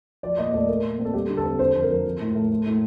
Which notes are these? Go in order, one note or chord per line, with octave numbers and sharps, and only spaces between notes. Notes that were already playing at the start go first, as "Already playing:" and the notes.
F3 D5
A#2 D#5
A3 D5
A3 A#4
A#2
C4
A4
G3 G4
D3
A4
C4
D3 C5
F2
A#4
F3
F3
A2
A3
A3
A2